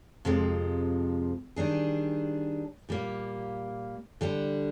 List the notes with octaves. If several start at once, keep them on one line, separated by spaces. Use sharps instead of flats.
F2 C3 F3 G#3
D#3 G3 D4 G#4
A#2 G3 A#3
D3 G3 D4